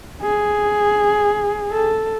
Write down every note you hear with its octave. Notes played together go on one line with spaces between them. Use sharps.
G#4
A4